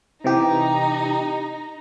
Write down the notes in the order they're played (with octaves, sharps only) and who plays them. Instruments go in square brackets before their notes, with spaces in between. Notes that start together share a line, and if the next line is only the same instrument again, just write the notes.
[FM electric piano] C3 E3 G4 [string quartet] D#4 A#5